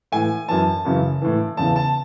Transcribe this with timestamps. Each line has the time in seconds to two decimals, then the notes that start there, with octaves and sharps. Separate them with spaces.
0.12 A2 E3 G#5
0.48 F#2 E3 A5
0.85 F#2 C#3 E3
1.22 A2 E3
1.57 E2 C#3 E3 A5
1.76 A5